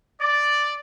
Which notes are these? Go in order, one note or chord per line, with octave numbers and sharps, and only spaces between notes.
D5